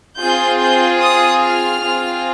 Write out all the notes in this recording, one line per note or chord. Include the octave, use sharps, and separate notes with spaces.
C4 F4 G#4 G6
G6
D#6
F6
C4 F4 G#4